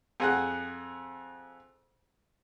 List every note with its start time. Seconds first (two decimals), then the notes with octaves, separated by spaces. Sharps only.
0.20 F2 G#4 F#5